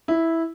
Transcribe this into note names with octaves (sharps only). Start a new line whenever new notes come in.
E4